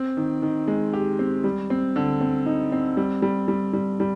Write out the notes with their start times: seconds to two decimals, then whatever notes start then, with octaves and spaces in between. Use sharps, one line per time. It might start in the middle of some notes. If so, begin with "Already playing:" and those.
Already playing: C4
0.17 D#3
0.42 D#3
0.68 G#3
0.93 G4
1.19 C4
1.44 G3
1.70 C4
1.96 D3
2.21 C4
2.46 D#4
2.72 C4
2.97 G3
3.22 G3
3.48 G3
3.73 G3
4.00 G3